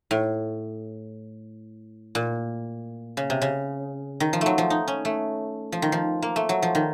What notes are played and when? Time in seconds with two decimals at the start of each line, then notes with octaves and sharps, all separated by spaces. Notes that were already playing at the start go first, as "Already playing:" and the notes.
0.11 A2
2.15 A#2
3.17 C#3
3.30 C3
3.42 C#3
4.20 D#3
4.33 F3
4.41 F#3 A3
4.58 F3
4.70 D#4
4.88 C#4
5.05 A3
5.72 F3
5.82 D#3
5.92 F3
6.22 A#3
6.36 A3
6.49 F#3
6.62 F3
6.75 D#3